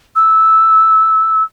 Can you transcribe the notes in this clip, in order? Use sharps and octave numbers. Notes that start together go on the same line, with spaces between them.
E6